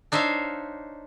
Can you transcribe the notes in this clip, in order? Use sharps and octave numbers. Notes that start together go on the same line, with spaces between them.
D4 D#4 C5 C#5 E5 F5